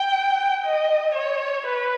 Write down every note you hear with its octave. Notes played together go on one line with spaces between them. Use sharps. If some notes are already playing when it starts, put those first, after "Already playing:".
Already playing: G5
D#5
C#5
B4